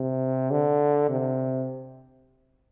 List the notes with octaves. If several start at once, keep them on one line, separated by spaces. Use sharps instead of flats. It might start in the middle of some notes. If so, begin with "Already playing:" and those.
Already playing: C3
D3
C3